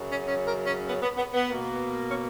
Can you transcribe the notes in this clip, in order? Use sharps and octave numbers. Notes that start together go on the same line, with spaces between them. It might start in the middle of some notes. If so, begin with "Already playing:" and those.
Already playing: F#2 C#3 F#3
C#4
C#4
A#4
C#4
B3
B3
B3
B3
B2 A#3
C#4